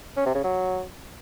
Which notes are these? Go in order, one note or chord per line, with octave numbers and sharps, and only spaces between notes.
C#4
C3
C#3
F#3